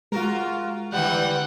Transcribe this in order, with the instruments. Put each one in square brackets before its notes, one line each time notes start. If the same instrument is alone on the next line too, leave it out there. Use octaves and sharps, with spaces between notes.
[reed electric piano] G#3 [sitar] F4 F#4 A#4
[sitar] D3 E3 G3 [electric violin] F#5 G5